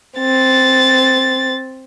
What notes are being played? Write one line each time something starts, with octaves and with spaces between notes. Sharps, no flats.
C4 A6